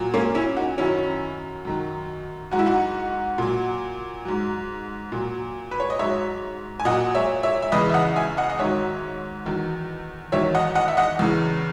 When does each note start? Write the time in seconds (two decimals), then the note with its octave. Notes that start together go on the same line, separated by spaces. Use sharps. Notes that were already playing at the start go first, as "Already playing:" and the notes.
Already playing: A#2 F#3
0.14 A#3 C#4
0.35 C#4 E4
0.57 D#4 F#4
0.78 F#2 D#3 F#3 C#4 E4
1.65 F#2 D#3 F#3
2.51 G#2 F#3 F#4
2.59 E4
2.66 D#4 F#4
3.38 A#2 F#3
4.25 G#2 F#3
5.12 A#2 F#3
5.71 B4
5.80 C#5
5.90 D#5
5.99 G#2 F#3 C#5 E5
6.80 G#5
6.85 A#2 F#3 D#5 F#5
7.15 C#5 E5
7.43 C#5 E5
7.62 E5
7.72 E2 C#3 E3 B4 D#5
7.90 E5
7.94 D#5 F#5
8.16 E5 G#5
8.37 D#5 F#5
8.50 D#5
8.59 G#2 D#3 F#3 C#5 E5
9.45 E2 D#3 F#3
10.32 E2 D#3 F#3 C#5 E5
10.55 D#5 F#5
10.75 D#5 F#5
10.88 E5
10.97 D#5 F#5
11.19 E2 C#3 E3